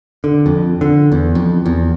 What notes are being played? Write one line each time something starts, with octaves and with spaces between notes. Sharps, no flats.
D3
F2
D3
E2
F2
E2